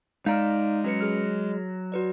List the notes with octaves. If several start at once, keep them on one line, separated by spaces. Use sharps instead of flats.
G#3 D#4 D5 F5 A#5 F6
F#3 C#4 B4 C#7
G#4 F6
F#4 B4 D5